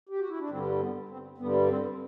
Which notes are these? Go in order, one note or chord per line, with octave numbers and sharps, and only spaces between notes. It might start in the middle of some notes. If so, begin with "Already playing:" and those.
G4
F#4
E4
D4
G2 D3 G3 C4
B3
C4
G2 D3 G3 B3
C4